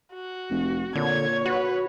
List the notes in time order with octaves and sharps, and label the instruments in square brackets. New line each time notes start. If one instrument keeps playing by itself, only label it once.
[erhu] F#4
[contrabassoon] F1
[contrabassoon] A#2 [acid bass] D3 [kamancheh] C#5 [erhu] G#6
[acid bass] F#4 [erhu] B4